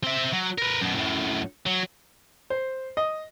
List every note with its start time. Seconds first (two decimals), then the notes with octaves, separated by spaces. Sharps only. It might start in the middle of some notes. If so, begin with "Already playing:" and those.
0.03 C4 E5
0.33 F#3
0.58 A#4 B4
0.81 F#2 B2
0.95 F#2 A2
1.66 F#3
2.50 C5
2.97 D#5